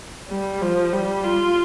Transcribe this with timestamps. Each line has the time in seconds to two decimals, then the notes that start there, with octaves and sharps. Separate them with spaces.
0.29 G3
0.62 F3
0.93 G3
1.24 F4